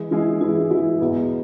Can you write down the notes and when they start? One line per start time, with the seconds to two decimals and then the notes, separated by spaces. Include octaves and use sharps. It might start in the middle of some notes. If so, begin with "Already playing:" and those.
Already playing: E3 G#3 E4 G#4
0.11 E3 G#3 E4 G#4
0.41 E3 G#3 E4 G#4
0.71 E3 G#3 E4 G#4
1.01 E2 B2 B3 F#4